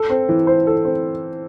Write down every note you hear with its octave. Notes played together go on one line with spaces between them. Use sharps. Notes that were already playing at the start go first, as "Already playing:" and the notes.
Already playing: A4
C4
E3
C5
A4
C4